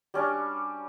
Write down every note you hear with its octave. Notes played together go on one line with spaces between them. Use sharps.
G3 C#4 D4 C#6